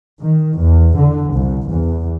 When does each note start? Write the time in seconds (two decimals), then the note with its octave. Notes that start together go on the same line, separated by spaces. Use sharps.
0.22 D#3
0.58 E2
0.98 D3
1.33 C2
1.70 E2